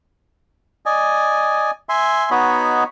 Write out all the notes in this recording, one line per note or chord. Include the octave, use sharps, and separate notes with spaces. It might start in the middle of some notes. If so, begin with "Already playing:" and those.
D5 D#5 G#5
E5 G#5 C6
B3 D#4 F#4 C#5 D#5 B5